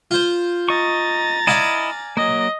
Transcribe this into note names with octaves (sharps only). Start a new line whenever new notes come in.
F4 C5
D#5 A#5 C#6 A6
E4 D5 D#5 F5 G#5
F#3 A#3 D#5